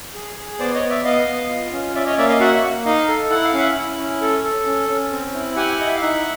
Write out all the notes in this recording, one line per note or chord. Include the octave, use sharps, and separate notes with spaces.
G#4
G#4
B3 C5 D5
C#5 D#5
B3
D5 E5
B3 D#5 F5
B3
F4
C#4
C#4 D5 E5
C#5 D#5
A#3 D5 E5
D#5 F5
F#4 E5 F#5
E5 F#5
A#3
D#4 D#5 F5
A4
E4 F#5
F5
C#4 E5 F#5
E4
C#4
A4
A4
C#4
C#4
C4
E4
G4 F#5 G#5
E4 D#5
E5
F5
D#4 E5 F#5